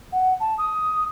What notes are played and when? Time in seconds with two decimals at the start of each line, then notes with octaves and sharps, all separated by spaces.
0.12 F#5
0.40 A5
0.58 D#6